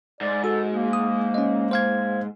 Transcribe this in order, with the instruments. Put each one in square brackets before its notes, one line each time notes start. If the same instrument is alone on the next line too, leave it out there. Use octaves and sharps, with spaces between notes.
[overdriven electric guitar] G#2 [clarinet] D5
[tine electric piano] F#4 [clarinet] A4
[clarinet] A#3
[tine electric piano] D#6
C#4 D#5
C5 F5 G#6